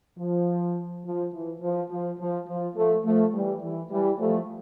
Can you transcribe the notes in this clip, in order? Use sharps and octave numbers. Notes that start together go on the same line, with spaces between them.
F3
F3
E3
F3
F3
F3
F3
F3 A3
F3 A3
E3 G3
E3
E3 G3
F3 A3